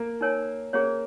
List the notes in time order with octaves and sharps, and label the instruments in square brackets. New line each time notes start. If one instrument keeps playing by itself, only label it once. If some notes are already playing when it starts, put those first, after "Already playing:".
Already playing: [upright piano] A#3
[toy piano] D#4 A#4 C#5 G#5
[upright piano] A#3 [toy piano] C#4 G#4 C#5